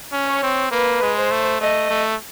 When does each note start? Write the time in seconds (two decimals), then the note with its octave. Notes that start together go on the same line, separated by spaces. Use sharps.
0.12 C#4
0.28 C#5
0.43 C4
0.72 A#3 B4
1.02 G#3
1.16 C5
1.31 A3
1.61 A3 D#5
1.90 A3